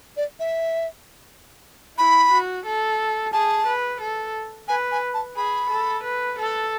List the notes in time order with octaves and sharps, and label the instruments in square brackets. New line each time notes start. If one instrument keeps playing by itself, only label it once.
[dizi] D5
E5
[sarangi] E4 [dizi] B5
[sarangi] F#4
A4
[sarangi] G#4 [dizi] A5
[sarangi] B4
A4
[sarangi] B4 [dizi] G#5
[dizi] G#5
A5
[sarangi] G#4 [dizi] B5
[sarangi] A4
B4
A4